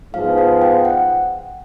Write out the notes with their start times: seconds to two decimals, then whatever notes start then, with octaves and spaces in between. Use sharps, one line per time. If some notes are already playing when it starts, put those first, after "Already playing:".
0.14 G#2 F3 G#3 B3 F5
0.38 F5
0.62 G5
0.85 F#5